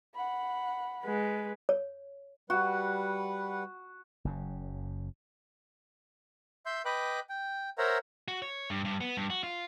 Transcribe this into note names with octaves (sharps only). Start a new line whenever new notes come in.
F#5 B5
G#3 B4
C#5
G3 F#4 B4 F#5
F#1 F#2 C#3
E5 C6 G6
B4 D#5 G5 B5 D6 F#6
G5
A#4 C5 C#5 E5 F#5 A#5
F#4
C#5
G2
G2
B3
G2
F#4
F4